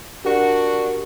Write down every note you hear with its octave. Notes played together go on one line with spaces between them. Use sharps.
D4 F#4 G4 A#4